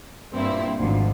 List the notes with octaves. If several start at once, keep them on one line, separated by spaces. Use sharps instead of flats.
G2 A#2 C4 E4
G#1 D2 F3